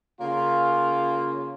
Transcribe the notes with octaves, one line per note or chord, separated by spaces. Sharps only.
C#3 A#3 F4